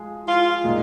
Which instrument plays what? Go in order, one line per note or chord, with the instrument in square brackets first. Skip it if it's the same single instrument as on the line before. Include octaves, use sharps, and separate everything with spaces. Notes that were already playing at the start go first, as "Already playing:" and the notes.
Already playing: [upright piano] F3 G#3 G#4
[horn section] F4
[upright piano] A#2 G#3 D#4